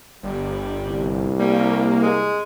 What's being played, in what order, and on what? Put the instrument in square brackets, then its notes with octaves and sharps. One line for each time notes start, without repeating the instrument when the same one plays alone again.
[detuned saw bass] G1 [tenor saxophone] G3
[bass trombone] C2
[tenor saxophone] G3 [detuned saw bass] A#3
[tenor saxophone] G#3